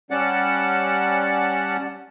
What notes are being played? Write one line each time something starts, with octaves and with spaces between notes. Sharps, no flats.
G3 C#4 D5 F#5 A5